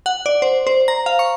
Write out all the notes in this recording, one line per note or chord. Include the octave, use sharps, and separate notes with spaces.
F#5
D5
C5
C5
A#5
F5
C#6